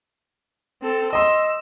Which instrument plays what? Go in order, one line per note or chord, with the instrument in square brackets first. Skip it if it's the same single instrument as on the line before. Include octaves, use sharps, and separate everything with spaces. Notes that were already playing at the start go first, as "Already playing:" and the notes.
[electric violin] C4 A4
[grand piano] D#5 C6 [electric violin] E6